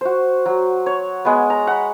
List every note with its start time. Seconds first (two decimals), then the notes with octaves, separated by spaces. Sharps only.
0.01 F#4 C5
0.46 F#3
0.86 C#5
1.25 G#3 B3
1.50 A#5
1.67 F#5 B5